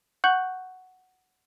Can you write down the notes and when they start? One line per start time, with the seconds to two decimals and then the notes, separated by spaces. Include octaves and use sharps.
0.24 F#5 C#6 F#6 G6 F#7